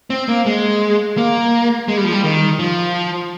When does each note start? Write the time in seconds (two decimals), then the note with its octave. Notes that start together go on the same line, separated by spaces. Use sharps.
0.10 C4
0.28 A#3
0.46 G#3
1.18 A#3
1.88 G#3
1.97 G3
2.04 F3
2.12 G3
2.24 D#3
2.59 F3